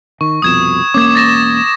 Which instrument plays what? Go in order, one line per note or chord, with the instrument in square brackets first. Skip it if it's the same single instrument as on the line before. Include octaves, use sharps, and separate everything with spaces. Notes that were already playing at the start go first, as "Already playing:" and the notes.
[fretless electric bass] D#3 [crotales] C#6
[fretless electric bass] C2 F2 B2 [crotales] D#6 G#6 E7
[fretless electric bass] E1 A#3 C#4 [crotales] D6 G#6
[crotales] A6 A#6 E7